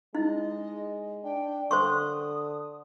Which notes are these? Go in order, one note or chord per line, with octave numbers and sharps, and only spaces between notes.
G#3 D#4 E4 D#5
D4 G5
D3 C5 C6 C#6 D#6